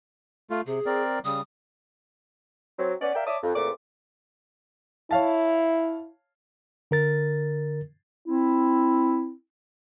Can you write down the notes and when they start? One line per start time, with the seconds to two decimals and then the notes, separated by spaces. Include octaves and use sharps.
0.50 A3 F4
0.67 C3 G#4
0.86 C4 A#4 D5
1.25 C#3 G3 D#6
2.79 F#3 C4
3.01 B3 C#4 B4 D5
3.15 A#4 D5 E5 F5 G5
3.27 C#5 D5 E5 A5 D6 D#6
3.43 F2
3.55 E2 A#2 A3 C4 D6
5.11 E4 C#5 F5 A5
6.91 D3 A#4 A6
8.27 C4 E4